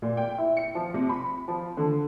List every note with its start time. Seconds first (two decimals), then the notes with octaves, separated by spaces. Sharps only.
0.02 A#2
0.17 G5
0.38 E4
0.57 C#7
0.75 F3
0.94 C3
1.09 B5
1.48 F3
1.77 D3